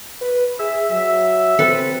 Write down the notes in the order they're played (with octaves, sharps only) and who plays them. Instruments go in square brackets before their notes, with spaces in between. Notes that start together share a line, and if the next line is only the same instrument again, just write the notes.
[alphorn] B4
[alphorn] G#4 [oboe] E5
[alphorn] F#3 [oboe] E5
[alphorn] C4 [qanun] A4 B4